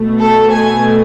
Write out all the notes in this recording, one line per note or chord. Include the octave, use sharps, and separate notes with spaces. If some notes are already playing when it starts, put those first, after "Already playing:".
Already playing: B2 A3
A4
G#5